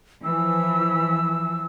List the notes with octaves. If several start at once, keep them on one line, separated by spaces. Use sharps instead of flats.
E3 F3 E6